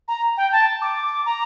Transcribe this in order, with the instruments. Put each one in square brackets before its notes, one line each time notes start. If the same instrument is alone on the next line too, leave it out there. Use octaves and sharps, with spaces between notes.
[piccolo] A#5
G5
A5
D6
A#5